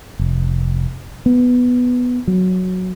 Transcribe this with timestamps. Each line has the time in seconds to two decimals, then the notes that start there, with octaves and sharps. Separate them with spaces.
0.19 F1
1.26 B3
2.27 F#3